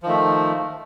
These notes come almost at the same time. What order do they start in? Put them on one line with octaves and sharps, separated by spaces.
F3 D#3 A3